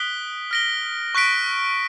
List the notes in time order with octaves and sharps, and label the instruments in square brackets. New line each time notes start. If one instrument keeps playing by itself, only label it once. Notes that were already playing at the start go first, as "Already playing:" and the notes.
Already playing: [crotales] D#6 F#6 B6 D7 G7
F6 A#6 D7 G7
C#6 F#6 B6 D7